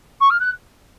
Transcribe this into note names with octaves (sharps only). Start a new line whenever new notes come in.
C#6
F6
F#6